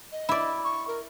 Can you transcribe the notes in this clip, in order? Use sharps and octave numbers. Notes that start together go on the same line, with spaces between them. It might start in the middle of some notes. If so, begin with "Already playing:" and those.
D#5
E4 D5
C#6
A#4